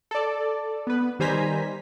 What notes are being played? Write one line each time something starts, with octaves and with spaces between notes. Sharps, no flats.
A4 D5
B3 B4
D#3 G3 C5 G#5 A#5 B6